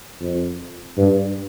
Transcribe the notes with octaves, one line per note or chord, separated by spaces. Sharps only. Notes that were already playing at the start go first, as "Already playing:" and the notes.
F2
G2